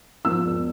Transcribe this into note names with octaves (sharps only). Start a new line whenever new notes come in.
F3 E6
E1